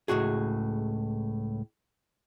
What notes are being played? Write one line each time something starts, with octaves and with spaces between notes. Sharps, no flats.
C#2 A2 F#4 G#4